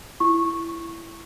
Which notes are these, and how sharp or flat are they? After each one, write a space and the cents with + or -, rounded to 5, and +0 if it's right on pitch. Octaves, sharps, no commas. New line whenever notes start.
E4 +15 C#6 -10